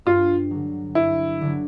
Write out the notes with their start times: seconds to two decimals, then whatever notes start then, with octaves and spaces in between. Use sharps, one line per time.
0.06 G2 F4
0.51 D3 F#3
0.95 G2 E4
1.41 D3 F#3